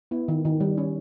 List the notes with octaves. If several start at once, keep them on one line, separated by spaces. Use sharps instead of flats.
B3 E4
D#3
D#3
G3
C#4